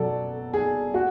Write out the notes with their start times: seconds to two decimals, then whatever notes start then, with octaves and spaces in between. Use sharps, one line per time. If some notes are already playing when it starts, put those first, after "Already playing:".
Already playing: B2 F#3 A4 D5
0.54 G#4
0.94 F#4